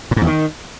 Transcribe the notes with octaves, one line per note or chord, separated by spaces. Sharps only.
A#2
G#2
E2
D#3